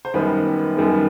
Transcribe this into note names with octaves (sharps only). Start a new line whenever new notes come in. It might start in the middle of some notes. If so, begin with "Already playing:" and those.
C5
F#2 D#3 G3 B3 B4
F#2 D#3 G3 B3